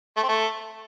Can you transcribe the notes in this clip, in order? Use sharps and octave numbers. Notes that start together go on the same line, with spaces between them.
A3
C4
A3